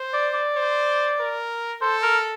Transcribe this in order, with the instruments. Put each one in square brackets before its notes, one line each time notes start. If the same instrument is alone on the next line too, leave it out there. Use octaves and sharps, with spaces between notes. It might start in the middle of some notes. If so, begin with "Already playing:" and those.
Already playing: [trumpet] C5
[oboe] D5
D5
[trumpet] C5
A#4
[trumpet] A4 [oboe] C5
[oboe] A#4